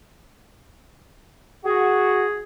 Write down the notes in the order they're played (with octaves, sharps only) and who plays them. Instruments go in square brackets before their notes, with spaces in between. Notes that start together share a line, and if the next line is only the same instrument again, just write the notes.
[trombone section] F#4 [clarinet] G#4